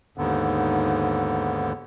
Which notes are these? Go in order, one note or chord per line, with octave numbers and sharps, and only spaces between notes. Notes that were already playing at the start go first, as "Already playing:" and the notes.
D#2 G#2 D3 B3